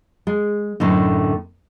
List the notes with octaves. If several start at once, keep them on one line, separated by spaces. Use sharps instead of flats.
G#3
F#2 A2 D3 D#4